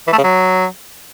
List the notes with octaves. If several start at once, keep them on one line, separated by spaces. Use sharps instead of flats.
E3
A3
C#3
F#3